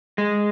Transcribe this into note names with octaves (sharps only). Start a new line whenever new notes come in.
G#3